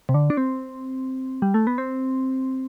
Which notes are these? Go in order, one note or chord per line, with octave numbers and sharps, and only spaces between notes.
C3
D3
D4
C4
G3
A3
B3
C4